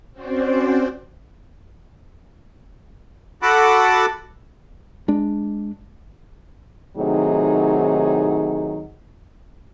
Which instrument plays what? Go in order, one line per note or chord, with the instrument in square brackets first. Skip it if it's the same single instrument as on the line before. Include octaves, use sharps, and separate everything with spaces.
[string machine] C4 C#4 F#4 C5 D5
[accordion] F#4 A4 F#5 A5 B5 D6
[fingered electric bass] G#3 D4
[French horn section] A2 C3 D#3 F#3 D#4 G#4